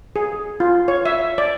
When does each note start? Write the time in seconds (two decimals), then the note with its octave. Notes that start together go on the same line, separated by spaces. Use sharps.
0.16 G#4
0.60 F4
0.88 C#5
1.06 E5
1.38 D5